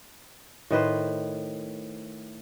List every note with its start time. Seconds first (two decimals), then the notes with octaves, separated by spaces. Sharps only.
0.71 A2 D#3 B4 C5